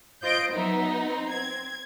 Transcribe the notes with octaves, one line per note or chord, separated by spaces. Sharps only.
F4 C5 D#5 G6 D7
F#3 B3 D#4 E5
C4
G#6